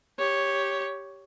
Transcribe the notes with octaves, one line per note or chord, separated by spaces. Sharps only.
G4 C#5